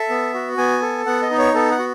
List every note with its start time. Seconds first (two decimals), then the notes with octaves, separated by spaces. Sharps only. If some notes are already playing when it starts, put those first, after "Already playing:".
Already playing: A4 E5
0.09 B3
0.34 F#4
0.58 B3 G#5
0.82 A4
1.06 B3 F#5
1.22 D#5
1.31 D#4
1.38 C#5
1.54 B3 A4
1.71 F#5
1.79 F#4